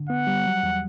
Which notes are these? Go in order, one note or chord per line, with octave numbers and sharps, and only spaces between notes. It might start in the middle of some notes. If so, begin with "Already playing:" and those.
Already playing: D3
B3 F#5
G3
F#3
E2